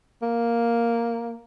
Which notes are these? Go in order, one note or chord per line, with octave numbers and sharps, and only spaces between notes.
A#3